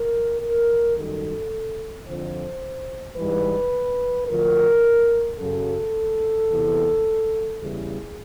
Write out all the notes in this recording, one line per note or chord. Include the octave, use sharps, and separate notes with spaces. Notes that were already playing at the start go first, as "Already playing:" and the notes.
Already playing: A#4
A#4
F#2 D#3 G3 A4
F2 D3 F3 C5
G#2 E3 G3 B4
D2 D3 F3 A#4
F#2 C#3 F#3 A4
E2 C3 E3
E2 C#3 E3 G3 G#4